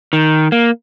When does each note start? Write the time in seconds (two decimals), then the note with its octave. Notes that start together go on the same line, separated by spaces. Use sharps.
0.13 D#3
0.52 A#3